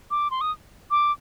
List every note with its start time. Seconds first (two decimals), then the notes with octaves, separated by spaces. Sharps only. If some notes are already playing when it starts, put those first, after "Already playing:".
0.11 D6
0.31 C6
0.41 D#6
0.91 D6